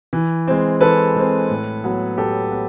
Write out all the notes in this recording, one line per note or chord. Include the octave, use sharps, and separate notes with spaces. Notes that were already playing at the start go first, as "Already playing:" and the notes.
E3
G#3 C4
E3 A4 B4
G#3 C4
A2
F#3 B3
A2 G4 A4
B3